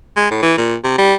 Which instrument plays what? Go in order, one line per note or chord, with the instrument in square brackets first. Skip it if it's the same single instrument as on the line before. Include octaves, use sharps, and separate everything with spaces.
[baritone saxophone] G#3
A2
E3
A#2
C3
G3